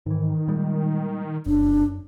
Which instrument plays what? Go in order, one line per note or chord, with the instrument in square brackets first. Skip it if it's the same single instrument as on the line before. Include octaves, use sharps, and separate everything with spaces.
[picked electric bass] G#2 E3 [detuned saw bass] D#3
[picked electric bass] A#2 G3 G#3
[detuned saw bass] F1 [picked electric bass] F#2 [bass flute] D4